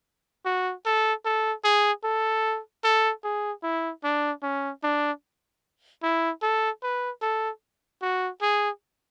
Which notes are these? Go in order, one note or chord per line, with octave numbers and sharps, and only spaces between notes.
F#4
A4
A4
G#4
A4
A4
G#4
E4
D4
C#4
D4
E4
A4
B4
A4
F#4
G#4